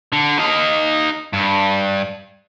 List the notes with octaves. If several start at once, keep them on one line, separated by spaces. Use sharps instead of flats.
D3
D#4 F5
G2